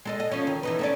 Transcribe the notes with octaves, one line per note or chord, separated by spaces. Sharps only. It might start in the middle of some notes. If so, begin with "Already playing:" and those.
G#3 A4 D#5
D#5
F3 C#4
D#3
E3 D#4 B4
A3 C#4 D5